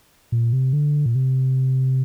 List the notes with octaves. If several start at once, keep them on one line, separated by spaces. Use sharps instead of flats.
A#2
C3
D3
A#2
C3